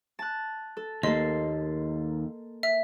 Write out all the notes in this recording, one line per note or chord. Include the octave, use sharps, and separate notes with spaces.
A5 F#6
A4
D#2 A#3 A4 D#5 C6
E5